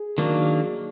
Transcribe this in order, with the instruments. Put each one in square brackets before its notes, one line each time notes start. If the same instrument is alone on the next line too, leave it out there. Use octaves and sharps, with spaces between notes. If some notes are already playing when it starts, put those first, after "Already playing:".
Already playing: [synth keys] G#4
[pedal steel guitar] D#3 F#3 A#3 D4